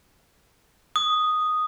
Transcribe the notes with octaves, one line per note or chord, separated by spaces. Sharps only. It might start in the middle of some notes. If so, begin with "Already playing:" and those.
D#6